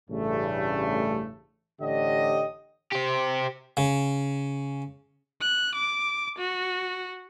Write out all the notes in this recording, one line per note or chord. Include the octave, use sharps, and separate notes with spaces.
A1 G2 C#3 A3
A1 D3 G4 C#5 D#5
G4 C5
C#3
F#6
D6
F#4